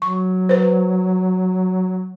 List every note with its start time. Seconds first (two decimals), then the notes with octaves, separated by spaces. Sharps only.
0.02 F#3 C#6
0.49 B4 C5